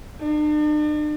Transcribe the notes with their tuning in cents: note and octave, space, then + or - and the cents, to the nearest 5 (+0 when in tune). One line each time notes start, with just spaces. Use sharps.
D4 +45